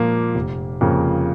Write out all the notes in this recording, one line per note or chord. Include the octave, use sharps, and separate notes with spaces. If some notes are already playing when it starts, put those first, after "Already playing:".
Already playing: A#2 F3 A#3
F1
F2 C#3 F3 A#3